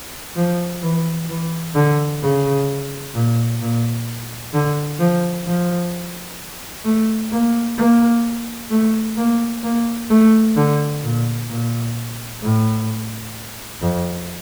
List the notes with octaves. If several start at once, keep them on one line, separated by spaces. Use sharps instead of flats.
F3
E3
E3
D3
C#3
A#2
A#2
D3
F3
F3
A3
A#3
A#3
A3
A#3
A#3
A3
D3
A#2
A#2
A2
F2